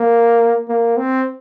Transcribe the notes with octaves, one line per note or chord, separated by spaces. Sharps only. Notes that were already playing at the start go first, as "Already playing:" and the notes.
Already playing: A#3
A#3
C4